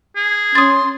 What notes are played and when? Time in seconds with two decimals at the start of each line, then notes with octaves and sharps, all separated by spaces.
0.16 G#4
0.55 C#4 C6 D#6 A6